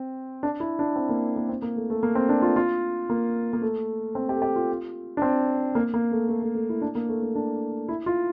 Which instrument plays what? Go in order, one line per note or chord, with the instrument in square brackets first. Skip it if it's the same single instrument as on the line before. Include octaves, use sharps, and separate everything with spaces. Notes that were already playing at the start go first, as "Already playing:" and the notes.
Already playing: [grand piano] C4
D4
E4
D4
C4
A#3
A#3
C4
A#3
A3
A3
A#3
C4
D4
F4
F4
A#3
A#3
A3
C4
G4
A4
G4
F4
D4
C4
A#3
A#3
A3
A3
A3
A3
E4
D4
A#3
A3
A3
D4
E4
F4